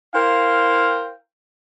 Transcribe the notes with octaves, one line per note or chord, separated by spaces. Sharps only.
E4 A#4 C5 F5 G5